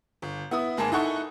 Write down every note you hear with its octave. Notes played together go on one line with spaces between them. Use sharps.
G1
B3 E4 D#6
G#1 G#3 A#3 G#4 A5
D#4 E4 A4 F#5 C#6